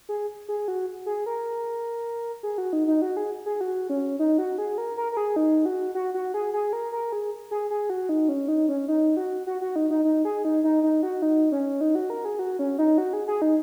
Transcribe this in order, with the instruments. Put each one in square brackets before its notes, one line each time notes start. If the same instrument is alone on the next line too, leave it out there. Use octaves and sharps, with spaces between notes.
[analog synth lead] G#4
G#4
F#4
G#4
A#4
G#4
F#4
D#4
D#4
F#4
G#4
G#4
F#4
C#4
D#4
F#4
G#4
A#4
A#4
A#4
G#4
D#4
F#4
F#4
F#4
G#4
G#4
A#4
A#4
G#4
G#4
G#4
F#4
D#4
C#4
D#4
C#4
D#4
F#4
F#4
F#4
D#4
D#4
D#4
G#4
D#4
D#4
D#4
F#4
D#4
C#4
D#4
F#4
A#4
G#4
F#4
C#4
D#4
F#4
G#4
G#4
D#4